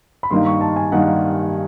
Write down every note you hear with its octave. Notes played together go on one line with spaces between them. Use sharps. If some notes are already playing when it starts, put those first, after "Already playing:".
B5
G2 D#3 G3 A#3 D#4 C6
C#6
A5
G#5
G2 D#3 G3 A#3 D#4 F#5